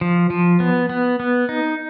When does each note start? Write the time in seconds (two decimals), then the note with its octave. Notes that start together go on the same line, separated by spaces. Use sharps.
0.01 F3
0.30 F3
0.60 B3
0.89 B3
1.20 B3
1.49 D#4